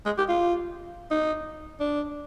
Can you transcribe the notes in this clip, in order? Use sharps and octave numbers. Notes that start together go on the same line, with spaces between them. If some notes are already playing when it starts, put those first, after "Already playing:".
G#3
G4
F4
D#4
D4